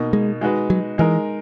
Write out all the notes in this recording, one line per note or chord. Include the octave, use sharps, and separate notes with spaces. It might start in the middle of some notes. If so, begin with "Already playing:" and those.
Already playing: B2 A#3 D#4
G#3
G#3 D#4 F#4 B4
F#3
E3 G#3 D#4 A#4